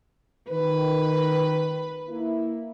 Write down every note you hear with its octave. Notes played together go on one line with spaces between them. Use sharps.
D#3 B4
A#3 E4